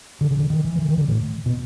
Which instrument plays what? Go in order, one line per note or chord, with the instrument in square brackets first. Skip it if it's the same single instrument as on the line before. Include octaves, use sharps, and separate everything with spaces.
[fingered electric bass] D3
C#3
D3
D#3
E3
E3
D#3
D3
A2
B2